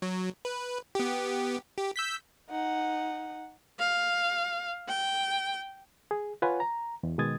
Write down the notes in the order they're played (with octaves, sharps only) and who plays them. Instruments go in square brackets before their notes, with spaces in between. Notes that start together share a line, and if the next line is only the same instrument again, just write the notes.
[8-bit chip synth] F#3
B4
B3 G4
G4
E6 G6 B6
[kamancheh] D#4 F#5
[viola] F5
G5
[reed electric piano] G#4
F4 B4 C#5 F#5 G#5
A#5
E2
B2 D#3 G#3 D#6 G#6 A6